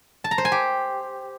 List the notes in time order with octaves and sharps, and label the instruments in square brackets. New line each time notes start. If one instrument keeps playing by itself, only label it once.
[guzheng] A5
A#5
C5
G#5
G4